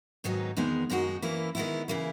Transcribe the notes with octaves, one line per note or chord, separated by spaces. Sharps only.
G#2 D#3 F#3 B3 D#4
E2 D#3 G#3 B3 D#4
F#2 D#3 G#3 D#4 F#4
E3 A#3 C#4 E4
D#3 G#3 B3 E4
C#3 E3 A#3 E4